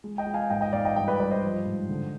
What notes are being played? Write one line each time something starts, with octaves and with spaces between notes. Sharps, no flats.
G#3
D#5 G5
G#3
F5 G#5
G#2 D#5 G5
D#5 G5
G#2 D5 F5
D#5 G5
G2 D#5 G5
B4 D5
G2 B4 D5
C5 D#5
F3
G#2
D3